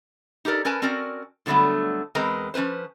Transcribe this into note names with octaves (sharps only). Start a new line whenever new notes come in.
D#4 G4 A4 A#4 D5
C#4 A#4 B4 G#5 A5
C4 C#4 F#4 A#4 D5
A2 D3 F#3 G3 A3 B3
E2 G#3 C4 A#4 B4 A#5
F3 C#4 D#4 B4 C5